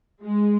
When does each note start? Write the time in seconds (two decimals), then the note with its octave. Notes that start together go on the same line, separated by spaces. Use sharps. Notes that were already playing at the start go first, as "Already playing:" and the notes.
0.23 G#3